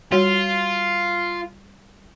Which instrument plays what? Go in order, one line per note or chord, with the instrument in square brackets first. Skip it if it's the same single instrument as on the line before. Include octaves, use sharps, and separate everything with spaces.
[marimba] G3 F#4 C#5 [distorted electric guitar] F4